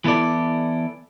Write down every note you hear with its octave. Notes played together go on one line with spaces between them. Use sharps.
E3 B3 E4 A4 D5